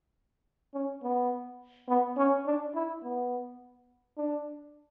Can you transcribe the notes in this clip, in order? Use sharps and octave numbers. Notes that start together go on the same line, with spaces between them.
C#4
B3
B3
C#4
D4
E4
B3
D4